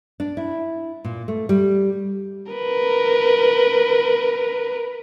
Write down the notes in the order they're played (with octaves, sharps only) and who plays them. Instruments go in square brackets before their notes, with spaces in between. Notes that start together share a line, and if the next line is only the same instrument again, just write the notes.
[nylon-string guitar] D4
E4
A#2
A3
G3
[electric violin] A#4 B4